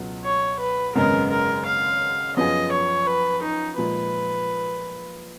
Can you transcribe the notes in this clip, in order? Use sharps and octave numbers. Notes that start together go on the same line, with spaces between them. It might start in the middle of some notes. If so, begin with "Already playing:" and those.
Already playing: C#2 B2 F#3 B3 F4
C#5
B4
G#1 F#2 C#3 G#3 B3 A#4
A#4
F5
F#2 F3 B3 F4 G#4 D#5
C#5
B4
D#4
A#2 F3 G#3 B4